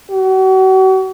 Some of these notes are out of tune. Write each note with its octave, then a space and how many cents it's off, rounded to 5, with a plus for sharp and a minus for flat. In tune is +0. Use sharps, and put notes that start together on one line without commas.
F#4 +40